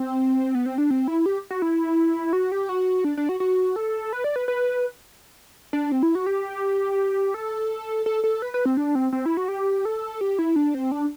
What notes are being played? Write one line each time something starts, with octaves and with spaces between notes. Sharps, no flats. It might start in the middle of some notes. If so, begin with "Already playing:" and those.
Already playing: C4
B3
C4
D4
C4
E4
G4
F#4
E4
F#4
G4
F#4
D4
D4
F#4
F#4
A4
B4
D5
B4
B4
D4
C4
E4
F#4
G4
A4
A4
A4
B4
B4
C4
D4
C4
C4
E4
F#4
G4
A4
G4
E4
D4
C4
D4